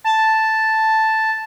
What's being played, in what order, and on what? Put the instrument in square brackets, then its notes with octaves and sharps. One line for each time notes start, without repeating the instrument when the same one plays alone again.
[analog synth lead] A5